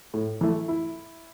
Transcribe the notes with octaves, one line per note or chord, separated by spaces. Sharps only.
A2
E3 A3
E4